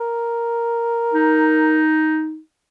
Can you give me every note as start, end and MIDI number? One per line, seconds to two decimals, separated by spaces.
0.01 1.81 70
1.13 2.39 63